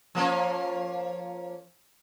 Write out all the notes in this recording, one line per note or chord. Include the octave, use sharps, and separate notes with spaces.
F3 A#3 C#4